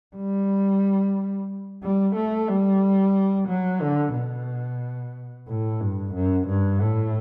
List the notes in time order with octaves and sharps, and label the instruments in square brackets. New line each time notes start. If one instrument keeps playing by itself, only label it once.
[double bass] G3
G3
A3
G3
F#3
D3
B2
A2
G2
F#2
G2
A2